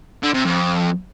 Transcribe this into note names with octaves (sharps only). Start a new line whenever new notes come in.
D3
C3
F2